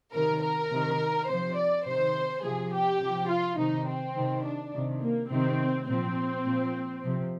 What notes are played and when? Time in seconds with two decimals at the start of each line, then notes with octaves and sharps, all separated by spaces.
0.13 C3 D#3 A#4
0.42 A#4
0.71 C3 D#3
1.28 C3 F3 C5
1.57 D5
1.86 C3 D#3 C5
2.43 C3 F3 G#4
2.73 G4
3.00 C3 F3
3.30 F4
3.58 C3 D#3 D#4
3.87 C4
4.16 C3 D#3
4.44 D4
4.74 C3 D#3
5.02 A#3
5.30 C3 D#3 C4
5.88 A#2 F3 C4
6.46 A#2 F3
7.03 C3 F3